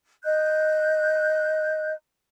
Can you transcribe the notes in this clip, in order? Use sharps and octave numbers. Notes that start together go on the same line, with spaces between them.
D#5 F#6 G6